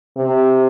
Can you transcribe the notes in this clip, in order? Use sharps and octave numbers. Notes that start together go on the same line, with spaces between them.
C3